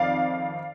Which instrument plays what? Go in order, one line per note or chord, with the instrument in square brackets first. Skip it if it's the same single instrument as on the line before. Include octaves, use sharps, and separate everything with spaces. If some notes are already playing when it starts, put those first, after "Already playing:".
Already playing: [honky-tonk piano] F2 D#3 D5 F5